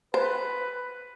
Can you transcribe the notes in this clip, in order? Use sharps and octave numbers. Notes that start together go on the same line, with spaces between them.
B4 C5